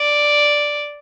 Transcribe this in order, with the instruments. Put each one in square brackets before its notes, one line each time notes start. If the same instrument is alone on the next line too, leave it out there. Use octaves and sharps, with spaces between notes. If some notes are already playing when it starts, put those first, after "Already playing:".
Already playing: [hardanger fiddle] D5